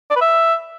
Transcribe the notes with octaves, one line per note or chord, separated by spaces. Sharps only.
D5
B4
E5